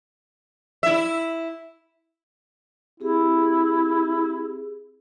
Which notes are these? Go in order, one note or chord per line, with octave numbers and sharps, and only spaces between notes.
E4 E5
C4 E4 G4 G#4